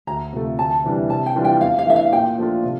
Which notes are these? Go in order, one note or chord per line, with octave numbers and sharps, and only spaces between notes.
D2 A#5
C3 F3 A3
D2 A5
C3 E3 G3 D4
C3 A5
G5
E3 G3 D4 F4
G5
E2 F5
F5
E3 A3 D4 E5
F5
A#2 G5
F3 A3 D4 F4
C3